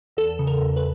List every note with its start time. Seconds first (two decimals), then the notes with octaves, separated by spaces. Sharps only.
0.17 E2 A4
0.39 C#3
0.47 A#4
0.61 E2
0.76 B4